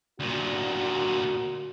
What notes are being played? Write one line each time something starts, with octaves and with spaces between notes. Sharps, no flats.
D2 A#2 F#4